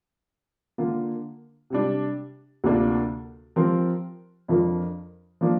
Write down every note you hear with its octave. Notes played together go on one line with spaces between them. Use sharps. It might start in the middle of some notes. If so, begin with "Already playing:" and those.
D3 A#3 F4
C3 G3 D4
D2 C3 A#3 D4 F4
F3 C4 G4 A#4
F2 F3 D4 F4 A#4
F3 A#3 D4